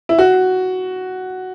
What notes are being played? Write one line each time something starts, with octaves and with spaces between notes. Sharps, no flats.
E4
F#4